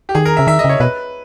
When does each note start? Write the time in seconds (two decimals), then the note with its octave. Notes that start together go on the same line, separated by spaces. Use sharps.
0.09 G4
0.15 D#3 G#4
0.25 A#4
0.37 C#3 E5
0.47 D#3 E5
0.59 D#5
0.64 C#3 C#5
0.80 B2 B4